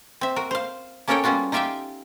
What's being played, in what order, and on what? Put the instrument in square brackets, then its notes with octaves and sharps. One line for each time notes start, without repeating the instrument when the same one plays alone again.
[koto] C4 E5
F#4 A#4
C5 F5
A#3 C#4 A4 A#4 C#5 G5
G3 B3 C#4 F4 F#4
D#4 F4 G4 E5 F5 G5